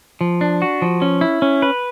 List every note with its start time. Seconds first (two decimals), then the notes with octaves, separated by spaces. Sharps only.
0.21 F3
0.41 D4
0.62 F#4
0.82 F3
1.02 C#4
1.21 E4
1.42 C#4
1.62 B4